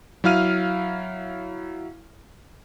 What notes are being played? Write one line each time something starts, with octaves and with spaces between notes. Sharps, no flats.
F#3 E4 F5 F6 D#7